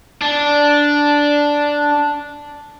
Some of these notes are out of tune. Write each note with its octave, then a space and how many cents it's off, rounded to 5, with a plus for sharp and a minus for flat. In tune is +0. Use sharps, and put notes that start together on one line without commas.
D4 -5